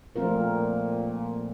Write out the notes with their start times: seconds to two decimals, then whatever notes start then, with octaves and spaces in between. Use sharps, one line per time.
0.15 A#2 F3 A3 C4 F4 A#4